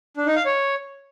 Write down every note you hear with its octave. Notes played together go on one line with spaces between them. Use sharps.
D4
D#4
F5
C#5